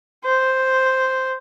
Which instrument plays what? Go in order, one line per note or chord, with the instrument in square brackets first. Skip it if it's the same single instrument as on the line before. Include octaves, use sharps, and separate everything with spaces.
[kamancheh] C5